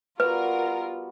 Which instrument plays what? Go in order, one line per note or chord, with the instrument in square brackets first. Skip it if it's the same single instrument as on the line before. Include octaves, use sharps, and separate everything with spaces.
[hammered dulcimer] G3 B3 F#4 [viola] F4 [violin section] A#4 [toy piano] B4